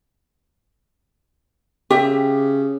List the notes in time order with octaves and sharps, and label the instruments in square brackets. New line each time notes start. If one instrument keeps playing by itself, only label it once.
[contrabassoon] C#3 [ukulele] G4 E5